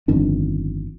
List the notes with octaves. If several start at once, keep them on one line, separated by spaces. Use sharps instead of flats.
G1 F2 D#3 D4